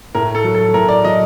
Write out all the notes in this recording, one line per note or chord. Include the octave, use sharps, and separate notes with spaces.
A2 A#4
A4
F#3
A4
A2 A#4
D5
F#3 D#5